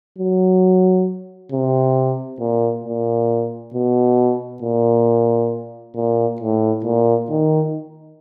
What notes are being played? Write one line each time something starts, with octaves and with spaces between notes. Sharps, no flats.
F#3
C3
A#2
A#2
B2
A#2
A#2
A2
A#2
D#3